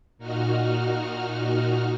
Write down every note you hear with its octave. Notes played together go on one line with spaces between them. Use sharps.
A#2 D#4 F#4 F6